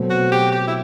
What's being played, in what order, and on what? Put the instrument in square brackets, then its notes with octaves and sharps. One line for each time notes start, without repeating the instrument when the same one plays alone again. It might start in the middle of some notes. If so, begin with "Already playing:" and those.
Already playing: [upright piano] B2 F#3 A3 C4
[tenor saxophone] F#4
G4
G4
E4